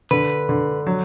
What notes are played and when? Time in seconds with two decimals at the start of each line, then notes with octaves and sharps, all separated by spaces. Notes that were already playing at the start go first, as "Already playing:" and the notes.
0.11 D3 B4
0.49 D3
0.87 F#3